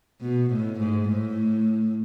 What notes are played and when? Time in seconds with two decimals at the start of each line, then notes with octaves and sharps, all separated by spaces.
0.21 B2
0.50 A2
0.80 G#2
1.09 A2